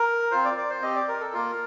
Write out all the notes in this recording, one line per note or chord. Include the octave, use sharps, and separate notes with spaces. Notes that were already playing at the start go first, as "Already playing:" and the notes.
Already playing: A#4
C4 F4 C5
D5
D5
C5
C4 G4 D#5
D5
A#4
A4
A#3 F4 A#4